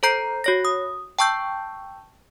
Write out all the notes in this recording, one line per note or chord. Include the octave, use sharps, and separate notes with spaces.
A4 C5 A#5 G6 C7
F#4 C#5 A#6
D#6
G5 A5 C#6 E6 G6